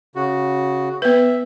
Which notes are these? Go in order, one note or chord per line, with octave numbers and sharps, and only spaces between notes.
C#3 F#4
B3 B4 E5